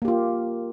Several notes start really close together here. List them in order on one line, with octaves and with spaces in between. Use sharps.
A#3 G4 F4